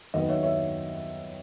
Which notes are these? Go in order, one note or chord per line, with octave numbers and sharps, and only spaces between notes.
D#2 D#3 F#3 B3 B4 D#5
C#5 E5
C#5 E5